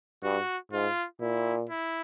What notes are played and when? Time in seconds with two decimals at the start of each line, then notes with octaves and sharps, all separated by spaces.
0.23 G2 F#4
0.72 G#2 F4
1.21 A#2 E4
1.69 E4